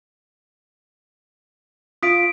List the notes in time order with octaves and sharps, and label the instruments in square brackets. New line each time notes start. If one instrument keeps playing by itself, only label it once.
[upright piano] F4 [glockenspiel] D#6 B6 D7